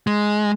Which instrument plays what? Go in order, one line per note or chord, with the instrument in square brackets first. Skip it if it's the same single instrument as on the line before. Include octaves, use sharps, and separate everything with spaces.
[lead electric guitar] G#3